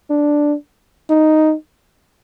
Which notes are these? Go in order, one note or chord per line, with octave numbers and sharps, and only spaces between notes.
D4
D#4